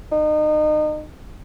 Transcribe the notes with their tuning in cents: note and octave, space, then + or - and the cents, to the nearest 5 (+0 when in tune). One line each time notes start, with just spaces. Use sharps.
D#4 -30